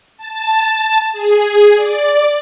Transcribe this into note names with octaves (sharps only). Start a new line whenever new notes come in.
A5
G#4
D5